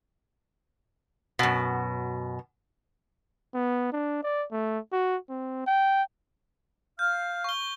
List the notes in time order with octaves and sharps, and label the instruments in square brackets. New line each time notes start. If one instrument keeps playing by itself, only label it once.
[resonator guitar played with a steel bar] F#2 B2
[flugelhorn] B3
D4
D5
A3
F#4
C4
G5
[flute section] F5 F6 [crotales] G6
[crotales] C#6 G7